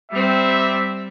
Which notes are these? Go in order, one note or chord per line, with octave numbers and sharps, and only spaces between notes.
G3 C4 E5